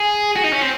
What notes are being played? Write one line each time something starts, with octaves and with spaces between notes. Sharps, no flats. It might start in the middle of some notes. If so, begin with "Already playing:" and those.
Already playing: G#4
F#4
D#4
C#4
C4